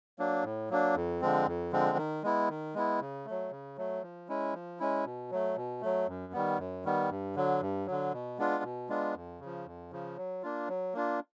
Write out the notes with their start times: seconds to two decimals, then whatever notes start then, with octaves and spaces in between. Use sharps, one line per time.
0.19 F#3 A#3 D4
0.44 A2
0.70 F#3 A#3 D4
0.96 F2
1.21 D3 F3 G#3 C4
1.46 F2
1.72 D3 F3 G#3 C4
1.97 D#3
2.23 G#3 B3 E4
2.49 D#3
2.75 G#3 B3 E4
3.01 C#3
3.25 A3
3.30 F#3
3.51 C#3
3.77 F#3 A3
4.02 F3
4.29 G#3 C#4 E4
4.54 F3
4.79 G#3 C#4 E4
5.05 B2
5.31 F#3 A3
5.56 B2
5.81 F#3 A3
6.08 F#2
6.33 D#3 G3 B3
6.59 F#2
6.85 D#3 G3 B3
7.10 G2
7.35 D3 F#3
7.61 G2
7.86 D3 F#3
8.12 B2
8.38 G#3 B3 D4 F4
8.63 B2
8.89 G#3 B3 D4 F4
9.15 F2
9.40 C#3 F3
9.66 F2
9.91 C#3 F3
10.17 F#3
10.43 A#3 D4 F4
10.68 F#3
10.94 A#3 D4 F4